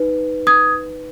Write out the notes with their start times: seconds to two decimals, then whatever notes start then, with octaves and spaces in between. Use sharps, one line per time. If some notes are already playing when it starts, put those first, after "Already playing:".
Already playing: D#4 B4
0.47 D#6 G#6